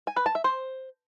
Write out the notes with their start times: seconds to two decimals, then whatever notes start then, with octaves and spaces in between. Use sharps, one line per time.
0.07 G#5
0.16 B4
0.26 A5
0.35 E5
0.44 C5